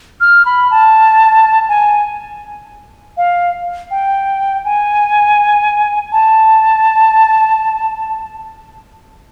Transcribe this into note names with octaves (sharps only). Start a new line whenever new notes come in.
F6
B5
A5
G#5
F5
G5
G#5
A5